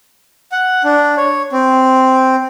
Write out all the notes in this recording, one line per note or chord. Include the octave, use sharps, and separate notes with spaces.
F#5
D4
C#5
C4